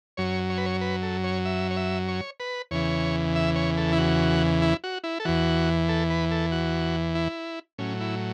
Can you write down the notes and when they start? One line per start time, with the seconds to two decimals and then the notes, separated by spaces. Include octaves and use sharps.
0.17 F#2 F#3 C#5
0.50 C#5
0.58 B4
0.66 C#5
0.81 B4
1.02 A4
1.24 C#5
1.45 E5
1.71 C#5
1.76 E5
2.08 C#5
2.40 B4
2.71 E2 C#3 E3 C#5
3.35 E5
3.56 C#5
3.77 A4
3.93 E4
3.98 F#4
4.62 E4
4.84 F#4
5.04 E4
5.20 A4
5.25 E2 E3 F#4
5.89 A4
6.10 B4
6.31 A4
6.52 F#4
7.15 E4
7.78 A2 F#3 C#4
8.00 E4